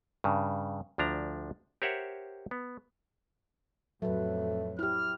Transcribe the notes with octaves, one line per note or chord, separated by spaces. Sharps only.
G2 C#3
D2 F3 D4 A#5
G4 A#4 C5 C#5 E5 F#5
B3
F2 A2 F#3 A3 B4
E4 G4 F6